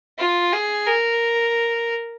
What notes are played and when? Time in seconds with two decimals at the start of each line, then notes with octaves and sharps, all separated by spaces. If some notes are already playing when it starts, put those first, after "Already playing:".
0.18 F4
0.53 G#4
0.86 A#4